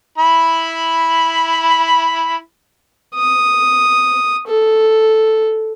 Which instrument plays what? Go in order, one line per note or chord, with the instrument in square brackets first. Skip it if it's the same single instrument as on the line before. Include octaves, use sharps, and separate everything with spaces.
[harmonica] E4 B5
[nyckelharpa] D#6
A4